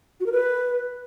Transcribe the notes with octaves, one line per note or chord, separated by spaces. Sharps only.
F#4
A#4
B4